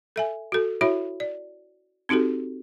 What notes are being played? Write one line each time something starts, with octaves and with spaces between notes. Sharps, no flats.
A4 E5 G#5
F#4 A4
E4 F#4 C#5 E5 B5
D5
C4 D#4 F#4 G4 A4